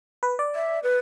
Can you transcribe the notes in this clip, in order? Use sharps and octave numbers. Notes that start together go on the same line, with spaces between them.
B4
D5
E5
B4